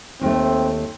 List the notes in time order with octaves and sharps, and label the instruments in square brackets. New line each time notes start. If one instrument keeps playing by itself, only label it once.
[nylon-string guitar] D#2 A3 [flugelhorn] C4